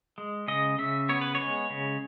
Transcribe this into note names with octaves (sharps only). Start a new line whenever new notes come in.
G#3
C#3 D#5
C#3 E5
B3 C#5
B4
C#5
G#3
C#3